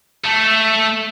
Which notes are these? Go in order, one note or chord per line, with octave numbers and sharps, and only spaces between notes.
A3 A4